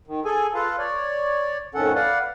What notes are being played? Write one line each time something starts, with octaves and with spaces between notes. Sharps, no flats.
D#3
G#4 A4 G#5
F4 A4 B4 F5
C#5 D5
F2 A2 D#3 C#4 A4 F#5
B4 D5 F5 F#5